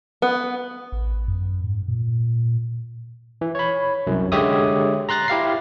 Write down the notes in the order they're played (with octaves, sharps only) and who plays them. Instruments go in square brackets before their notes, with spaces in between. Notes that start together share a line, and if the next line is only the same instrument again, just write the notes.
[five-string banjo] B3
[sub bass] A1
F#2
G#2
A#2
[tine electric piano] E3
C#5 B5
C2 F#2
D3 G#3 G4 C#5 E5 D#6
A#5 C6 F#6 A6 A#6
E4 G4 F5 C7